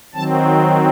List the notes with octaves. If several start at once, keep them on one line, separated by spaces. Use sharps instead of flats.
D#3 F#3 C4 A5